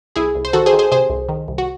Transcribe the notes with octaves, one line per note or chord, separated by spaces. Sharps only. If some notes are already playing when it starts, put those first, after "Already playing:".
C2 E4 G#4
C2
C5
D#3 F#4 A4
G#4 C5
D#3
G#4 C5
C3 G#4 C5
C2
D#3
C2
F#4